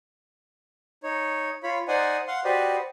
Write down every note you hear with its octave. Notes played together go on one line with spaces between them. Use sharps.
D#4 C#5
F4 C#5 B5
D#4 C5 D5 D#5 F#5 G#5
F5 F#5 C6
F#4 G4 B4 C5 D5 D#5